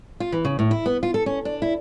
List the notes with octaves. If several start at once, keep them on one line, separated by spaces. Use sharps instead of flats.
F4
E3
C#3
A2
E4
B3
F4
A4
C#4
D4
E4